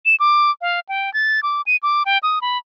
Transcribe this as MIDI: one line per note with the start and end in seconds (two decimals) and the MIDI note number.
0.06 0.16 100
0.20 0.51 86
0.61 0.80 77
0.89 1.12 79
1.14 1.40 93
1.43 1.61 86
1.66 1.76 99
1.83 2.03 86
2.06 2.18 79
2.23 2.39 87
2.42 2.58 83